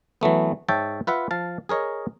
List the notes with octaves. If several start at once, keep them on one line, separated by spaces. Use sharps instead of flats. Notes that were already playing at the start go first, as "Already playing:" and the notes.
E3 F#3 A3 B3
G#2 C#5 E5 G5 A5
F4 B4 E5 F#5
F3 F5 A5
G#4 A#4 C#5 D#5